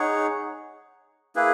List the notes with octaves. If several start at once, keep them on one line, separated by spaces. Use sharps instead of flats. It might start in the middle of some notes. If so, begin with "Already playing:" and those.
Already playing: D#4 G#4 C#5 F#5
A#3 E4 G#4 B4